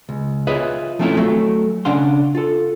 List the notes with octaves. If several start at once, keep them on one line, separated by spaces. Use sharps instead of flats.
C#2
F4 G#4 B4 C#5 D#5 E5
F3 A3 C4 C#4 E4 F4
F#3 A3
C#3 C#4 D4 F5 F#5 C6
F4 A4